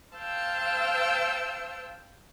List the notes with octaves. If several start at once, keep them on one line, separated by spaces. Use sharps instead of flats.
C5 F5 G5 A5 E6